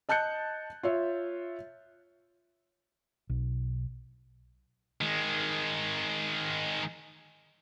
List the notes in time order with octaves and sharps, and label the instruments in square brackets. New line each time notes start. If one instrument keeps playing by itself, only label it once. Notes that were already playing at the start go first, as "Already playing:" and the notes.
[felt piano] D#5 A5 F#6 G6 C#7
F4 C#5 E5
[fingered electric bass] B1
[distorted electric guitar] D#3 G#3